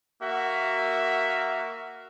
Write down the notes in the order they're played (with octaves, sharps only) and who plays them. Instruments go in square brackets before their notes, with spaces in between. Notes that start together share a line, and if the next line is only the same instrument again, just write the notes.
[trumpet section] A#3 F#4 E5